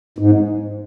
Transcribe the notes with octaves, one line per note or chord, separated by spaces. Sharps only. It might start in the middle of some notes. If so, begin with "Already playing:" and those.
G#2